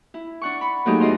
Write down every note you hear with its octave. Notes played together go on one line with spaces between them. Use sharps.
E4
D4 F#5 C#6
B5
F#3 A3 A#3 D#4 G4 G#4
E2 D4 F4 D#5 F5 C6